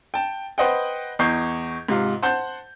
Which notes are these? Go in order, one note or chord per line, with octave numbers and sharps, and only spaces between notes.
G5 A5
B4 C5 D#5 F#5 G5
E2 D#5 C#6 G6 C7
G#2 C3 F4
C5 F#5 A5 G6